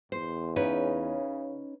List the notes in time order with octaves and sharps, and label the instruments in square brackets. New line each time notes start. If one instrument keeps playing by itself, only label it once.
[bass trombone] E2 [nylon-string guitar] C5
[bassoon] C#3 [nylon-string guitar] C#4 D#4 B4